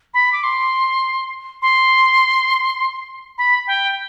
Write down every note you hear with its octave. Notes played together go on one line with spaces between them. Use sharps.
B5
D6
C6
C6
B5
G5